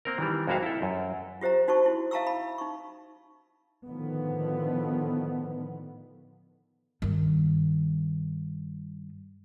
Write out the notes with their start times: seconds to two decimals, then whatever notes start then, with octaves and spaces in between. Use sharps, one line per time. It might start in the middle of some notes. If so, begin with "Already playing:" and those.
0.05 A#3 C4 A#4
0.18 D#3 E3 G3
0.47 F2 G#3 A#3 F#4 E5 F5
0.63 E4 A4
0.82 F#2
1.41 F4 G4 C5 E5 A#5
1.68 D#4 F#4 C5 A5 C#6
1.86 E4 F#4
2.11 E5 F5 A5 A#5 C#6 E6
2.27 B5
2.58 D#4 C#6
3.87 A2 D3 D#3 F3 B3
7.02 G2 D#3